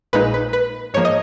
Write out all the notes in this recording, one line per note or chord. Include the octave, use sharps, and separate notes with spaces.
A#1 A#2 G#3 D#4 B4
B4
B4
G#2 F3 A#3 C#5
D#5